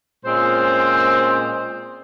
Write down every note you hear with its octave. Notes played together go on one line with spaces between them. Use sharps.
A#2 G#3 C4 C#4 C5